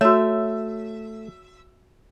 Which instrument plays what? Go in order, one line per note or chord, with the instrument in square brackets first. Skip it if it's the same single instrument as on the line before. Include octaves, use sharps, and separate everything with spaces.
[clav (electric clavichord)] A3 [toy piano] F#4 C#5 [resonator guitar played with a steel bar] E5